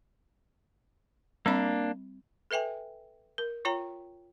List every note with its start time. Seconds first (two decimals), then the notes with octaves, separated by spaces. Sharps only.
1.46 G3 A#3 C4 D4 B5
2.51 A4 B4 E5 G5 G#5
3.38 A#4
3.65 F4 C#5 G5 A#5